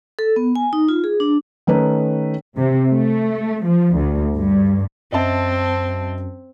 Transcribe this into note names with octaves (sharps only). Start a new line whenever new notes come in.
A4
B3
G#5
D#4
F4
G#4
D4
D#3 A3 C#4 D#4 B4
C3
A3
F3
D2
G2
F#2 C4 D#5 E5 A5